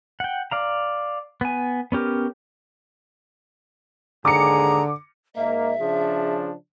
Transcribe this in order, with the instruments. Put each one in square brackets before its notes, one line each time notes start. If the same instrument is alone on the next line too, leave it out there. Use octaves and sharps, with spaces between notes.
[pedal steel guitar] F#5 G5
D5 F5 A#5
B3 G#5
B3 C#4 G4 A#4
[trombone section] D#2 G#2 G#4 [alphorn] D3 [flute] A#5 [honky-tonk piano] D6 C#7
[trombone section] G#2 A#3 [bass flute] D#5 [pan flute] E5
[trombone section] C#3 F3 D4 [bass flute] G#4